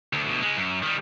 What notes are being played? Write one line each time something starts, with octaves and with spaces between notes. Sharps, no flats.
D2
D2 B2
C#3 G#3
F#2
D#3 G3